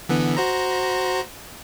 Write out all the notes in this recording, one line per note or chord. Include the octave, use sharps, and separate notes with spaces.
D3 E3 B3
F#4 C5 A#5